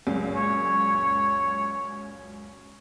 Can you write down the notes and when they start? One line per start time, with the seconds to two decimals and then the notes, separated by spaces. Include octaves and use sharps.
0.07 C#2 F#2 A#2
0.36 C#5